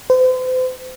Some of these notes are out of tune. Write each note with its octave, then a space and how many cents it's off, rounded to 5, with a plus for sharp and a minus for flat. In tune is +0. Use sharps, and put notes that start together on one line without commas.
C5 -40